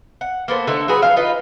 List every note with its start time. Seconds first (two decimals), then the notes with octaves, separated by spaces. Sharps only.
0.21 F#5
0.48 A#3 B3 A4 C5
0.67 D3 A3 D#4 A4
0.88 F#3 F#4 G#4 B4
1.02 F3 F#3 F5
1.16 D#4 F4 B4 D#5